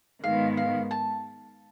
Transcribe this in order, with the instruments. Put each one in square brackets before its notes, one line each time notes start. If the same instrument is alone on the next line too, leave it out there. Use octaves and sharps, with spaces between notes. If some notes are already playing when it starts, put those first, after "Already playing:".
[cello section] G#2 D#3 G#3 B3 [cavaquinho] F5
[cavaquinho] F5
A5